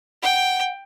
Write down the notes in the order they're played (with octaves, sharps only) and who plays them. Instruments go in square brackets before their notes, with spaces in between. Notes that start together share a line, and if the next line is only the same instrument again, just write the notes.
[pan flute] F#5 [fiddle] G5